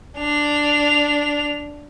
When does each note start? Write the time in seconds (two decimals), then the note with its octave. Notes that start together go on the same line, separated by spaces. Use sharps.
0.18 D4 F7